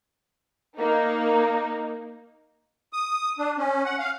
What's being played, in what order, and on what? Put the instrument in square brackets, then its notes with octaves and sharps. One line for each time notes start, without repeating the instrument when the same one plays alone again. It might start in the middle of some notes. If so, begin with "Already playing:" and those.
[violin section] A#3 D#4
[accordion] D#6
D4
C#4
F#5
F5